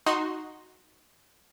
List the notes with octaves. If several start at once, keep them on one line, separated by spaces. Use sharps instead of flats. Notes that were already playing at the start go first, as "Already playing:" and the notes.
D#4 F#4 C6